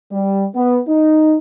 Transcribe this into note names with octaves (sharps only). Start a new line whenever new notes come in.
G3
B3
D#4